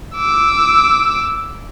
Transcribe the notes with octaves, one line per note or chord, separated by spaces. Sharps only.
D6 E6